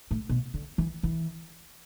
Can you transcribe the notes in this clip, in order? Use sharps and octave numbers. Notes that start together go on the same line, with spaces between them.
A2
B2
D3
E3
E3